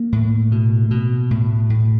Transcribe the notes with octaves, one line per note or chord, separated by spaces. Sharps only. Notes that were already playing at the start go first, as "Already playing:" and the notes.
Already playing: A#3
A2
B2
B2
A2
A2